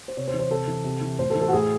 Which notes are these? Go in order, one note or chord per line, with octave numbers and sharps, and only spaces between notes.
C5
C3 C#5
C5
E3
C5
C3 A4
E3
C3
E3
A2 C5
A4
E3
A4
F#4
A2 G#4